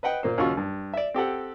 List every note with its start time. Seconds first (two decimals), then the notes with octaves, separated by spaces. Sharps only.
0.03 B4 D#5 F#5 G5
0.23 A#2 A#3 C5
0.38 D#2 C#3 F#3 F4 C#6
0.57 G2
0.94 D5 E5
1.14 C4 G4 A4 F#5